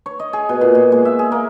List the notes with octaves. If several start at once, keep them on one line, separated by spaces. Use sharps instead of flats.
C#5
D#5
G#4
B2
A#2
A#2
G#3
E5
G#4
A#3